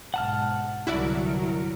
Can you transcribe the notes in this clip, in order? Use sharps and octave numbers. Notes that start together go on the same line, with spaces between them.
B1 G#2 F#5 A5 F6
C2 G2 D3 F#3 E4 F#4 A#4 D5